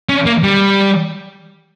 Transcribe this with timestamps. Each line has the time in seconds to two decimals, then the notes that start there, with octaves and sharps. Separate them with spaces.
0.09 C#4
0.26 A#3
0.43 G3